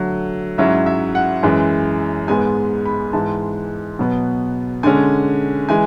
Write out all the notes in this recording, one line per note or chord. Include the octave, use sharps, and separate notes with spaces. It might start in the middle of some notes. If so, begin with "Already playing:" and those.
Already playing: D3 F#3 A3
G#2 F#3 C#4 E4 E5
E5
F#5
F#2 E3 G#3
G#2 G#3 B3 G#5
B5
G#2 E3 G#3 A5
B2 F#3 B3
D3 G#3 C#4 G#5
E3 G#3 G#5